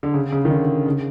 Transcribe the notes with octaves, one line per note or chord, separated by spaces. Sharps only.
D3
C#3
C#3
D#3
D3
C#3